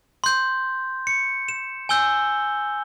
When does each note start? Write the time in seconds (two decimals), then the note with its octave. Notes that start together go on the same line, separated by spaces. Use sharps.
0.24 C6 G6
1.07 C#7
1.48 E7
1.89 G#5 E6 G6 G7